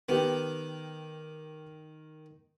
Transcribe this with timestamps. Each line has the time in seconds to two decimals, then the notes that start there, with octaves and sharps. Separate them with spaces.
0.09 D#3 B3 G4